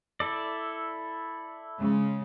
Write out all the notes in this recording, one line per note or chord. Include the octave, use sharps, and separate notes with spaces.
E4 A4 D5
C#3 G#3